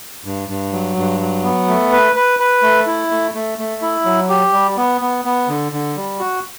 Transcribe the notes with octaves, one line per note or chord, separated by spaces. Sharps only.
G2
G2
F#3
G2
F#3
B3
A3
B4
B4
B4
A3
E4
A3
A3
A3
E4
F#3
G4
G3
B3
B3
B3
D3
D3
G3
F#4